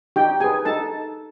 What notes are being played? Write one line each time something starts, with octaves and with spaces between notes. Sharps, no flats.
D#4 G4 G5
G4 G#4 B4 G#5
D#4 A4 A5